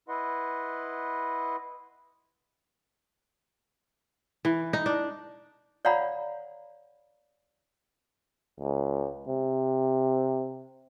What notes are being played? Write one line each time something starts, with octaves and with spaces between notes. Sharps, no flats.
E4 B4 D#5 F#5 C6
E3
D#4
D4
C#5 D5 F5 F#5 A#5 B5
C#2
C3